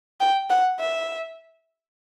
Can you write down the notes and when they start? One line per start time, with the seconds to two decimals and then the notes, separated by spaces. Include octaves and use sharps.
0.20 G5
0.50 F#5
0.80 E5